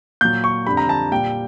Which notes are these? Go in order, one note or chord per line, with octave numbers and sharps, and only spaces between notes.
A#2 F#3 G6
C#6
F2 D3 G3 B5
A#5
A5
A#2 G3 G5